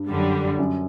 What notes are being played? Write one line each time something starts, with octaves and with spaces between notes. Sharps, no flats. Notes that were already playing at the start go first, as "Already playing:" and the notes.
Already playing: G2
F#2 D3 G3
F#2